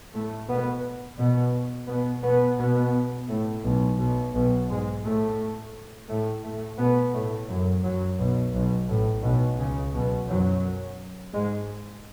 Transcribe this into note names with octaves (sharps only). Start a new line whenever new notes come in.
A2 A3
B2 B3
B2 B3
B2 B3
B2 B3
B2 B3
A2 A3
B1 B2
B1 B2
B1 B2
G#2 G#3
A2 A3
A2 A3
A2 A3
B2 B3
A2 A3
F#2 F#3
F#2 F#3
B1 B2
B1 B2
A1 A2
B1 B2
C#2 C#3
B1 B2
F#2 F#3
G#2 G#3